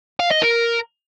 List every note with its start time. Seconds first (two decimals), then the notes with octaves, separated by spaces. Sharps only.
0.20 F5
0.31 D#5
0.42 A#4